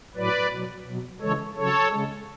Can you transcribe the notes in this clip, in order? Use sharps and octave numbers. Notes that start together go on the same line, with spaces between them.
A2 F#3 B4 D5
B2 F#3
B2 F#3
C#3 E3 G#3 A4 C#5
C#3 F#3 A4 C#5
C#3 G#3